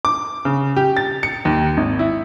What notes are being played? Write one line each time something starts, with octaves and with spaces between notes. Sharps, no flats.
D6
C#3
G4
A6
C#7
D#2
G#1
E4